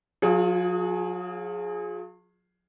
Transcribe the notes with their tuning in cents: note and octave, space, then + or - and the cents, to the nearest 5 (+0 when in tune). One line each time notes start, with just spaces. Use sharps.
F#3 -45 F4 +0 G#4 +10